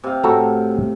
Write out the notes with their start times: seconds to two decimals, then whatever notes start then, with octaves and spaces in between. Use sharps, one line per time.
0.04 C3 F5
0.23 A2 F#4 A4 A#5